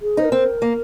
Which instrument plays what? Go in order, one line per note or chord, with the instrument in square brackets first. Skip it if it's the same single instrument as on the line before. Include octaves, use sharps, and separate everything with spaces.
[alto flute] G#4
[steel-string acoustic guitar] D#4 [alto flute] C5
[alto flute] A#4
[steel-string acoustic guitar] C4
A#3